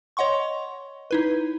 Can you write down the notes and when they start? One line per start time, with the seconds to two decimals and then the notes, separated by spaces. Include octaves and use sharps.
0.17 C#5 D#5 F#5 C6 C#6
1.11 D#4 E4 B4